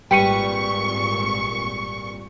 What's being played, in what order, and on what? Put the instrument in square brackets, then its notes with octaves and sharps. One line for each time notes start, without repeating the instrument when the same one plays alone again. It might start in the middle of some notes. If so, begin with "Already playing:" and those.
[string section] G#1 A#2 C#6 [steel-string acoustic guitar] G3 B4 [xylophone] G5 C#7 D#7